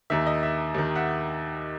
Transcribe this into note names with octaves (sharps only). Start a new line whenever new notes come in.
D#2 D#3 E5
D#5
E5
D#2 D#3
E5 F#5